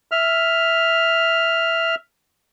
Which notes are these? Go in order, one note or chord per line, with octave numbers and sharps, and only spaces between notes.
E5 F6